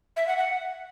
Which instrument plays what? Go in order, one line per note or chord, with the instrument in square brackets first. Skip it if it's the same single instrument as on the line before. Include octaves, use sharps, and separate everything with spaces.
[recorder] E5
F#5
F#5